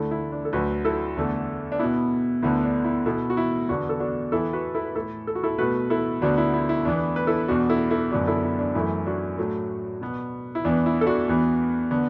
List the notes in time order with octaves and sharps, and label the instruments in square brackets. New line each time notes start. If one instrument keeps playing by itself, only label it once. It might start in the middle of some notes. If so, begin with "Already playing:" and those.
Already playing: [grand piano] D2 D3 A3 E4 A4
E4
D4
A4
D2 D3 F#3 F#4 B4
E4 A4
E2 D3 A3
D4
B2 B3 E4
D2 D3 B3 E4
D4
E4
B2 B3 E4 A4
F#4
E4
E2 D3 B3 D4 F#4
A4
D4 F#4
E2 E3 B3 E4 A4
F#4 B4
E4 A4
B4
A2 A3 E4 A4
A4
F#4
E4 A4
B2 A3 F#4 B4
E4 A4
D2 D3 B3 D4 F#4
E4
E4
E4
E2 E3 B3 D4
B4
E4 A4
E2 B2 B3 D4 F#4
E4 A4
E4 A4
F#2 D3 B3 D4 F#4
E4 A4
E4
D4
F#2 E3 A3 E4
D4 F#4
A2 F#3 A3
B2 B3
E4
E2 E3 B3 D4
E4
A4
D4 F#4
E2 E3 B3
D3 B3